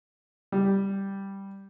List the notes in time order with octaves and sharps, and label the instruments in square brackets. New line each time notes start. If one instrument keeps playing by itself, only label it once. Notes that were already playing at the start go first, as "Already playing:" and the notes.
[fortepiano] G3